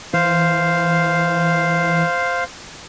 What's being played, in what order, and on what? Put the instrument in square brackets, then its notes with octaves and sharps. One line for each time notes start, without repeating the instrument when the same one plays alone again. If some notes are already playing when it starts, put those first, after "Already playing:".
[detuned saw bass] E3 [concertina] C5 F5